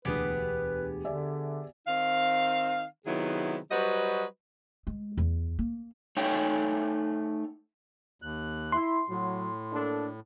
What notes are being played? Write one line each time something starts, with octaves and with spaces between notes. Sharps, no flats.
E1 D2 B3 G4 G#4 B4
D3 D5 E5 G#5
D#3 C4 D#4 F5
C3 D#3 F#3 B3 E4 G#4
F#3 G3 F#4 B4 C5 D#5
G#3
E2
A#3
A3 D#4 C#5 E5 G5 G#5
D#2 F#6
E4 C6
A2 F#3
A#3 D4 A4